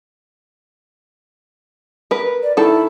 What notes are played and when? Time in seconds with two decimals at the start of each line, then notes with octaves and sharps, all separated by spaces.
2.11 A#4 B4
2.43 D5
2.57 D#3 E4 A4